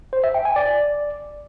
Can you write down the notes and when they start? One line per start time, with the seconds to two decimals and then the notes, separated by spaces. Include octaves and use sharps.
0.13 C5
0.24 E5
0.34 G5
0.45 G#5
0.56 D5